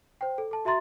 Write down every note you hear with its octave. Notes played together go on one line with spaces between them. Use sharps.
C5 G5
A4
A4 A5
F#4 E5 A#5 C6 A6